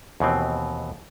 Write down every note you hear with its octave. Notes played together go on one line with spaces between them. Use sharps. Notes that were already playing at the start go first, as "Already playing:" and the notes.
D#2 B2 E3 C4